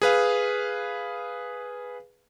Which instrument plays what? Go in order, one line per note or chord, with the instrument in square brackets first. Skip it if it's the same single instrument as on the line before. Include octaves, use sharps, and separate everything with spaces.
[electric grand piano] G#4 B4 F5